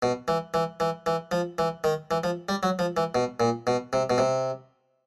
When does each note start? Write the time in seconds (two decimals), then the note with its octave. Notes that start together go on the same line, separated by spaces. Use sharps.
0.03 B2
0.28 E3
0.54 E3
0.80 E3
1.06 E3
1.32 F3
1.58 E3
1.84 D#3
2.11 E3
2.24 F3
2.49 G3
2.63 F#3
2.79 F3
2.97 E3
3.15 B2
3.40 A#2
3.67 B2
3.93 C3
4.10 B2
4.18 C3